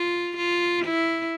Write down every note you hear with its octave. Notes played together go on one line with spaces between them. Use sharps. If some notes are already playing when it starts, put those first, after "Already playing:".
Already playing: F4
F4
E4